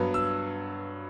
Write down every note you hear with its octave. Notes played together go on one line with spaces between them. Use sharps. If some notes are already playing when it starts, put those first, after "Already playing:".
Already playing: G2 F#3 B3
E6